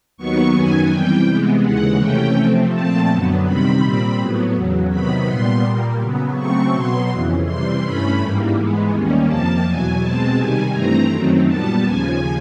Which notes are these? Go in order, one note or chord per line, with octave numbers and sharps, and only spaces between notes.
D#2 D#3 F#3 B3 C#6
F#2 D#3 F#3 B3 G#5
C3 E3 G3 G5
C3 E3 G#3 B3
D#2 C#3 E3 G#3 F#5
C3 E3 A3 C#4 G5
C3 F3 A3 C4
A#2 F3 A3 C4 A5
F#2 D3 F#3 B3
C3 D#3 G3 C4 B5
A#2 G3 C4 B5
A2 F#3 B3
E2 C#3 F#3
C3 D#3 F#3 B3 B5
A#2 G3 B3 C6
A#2 G3 A#3
C#3 F#3 B3
C#3 F#3 A3 C4 C#6
B2 F#3 B3 C6
F2 C#3 E3
C3 E3 G3 C6
G2 E3 A3 C#4 B5
G#2 E3 G3 A#3
G#2 E3 G#3 B3
D#2 D#3 G3 A#3 C#4
F2 C3 F3 A#3 A5
E2 B2 F#3 G#5
B2 G#3 C4 A5
C3 D#3 G3 G#5
G2 E3 A3 C4 A#5
F#2 D#3 F#3 A3 C4
A#2 G3 B3 A5
D#2 C#3 F3 G#5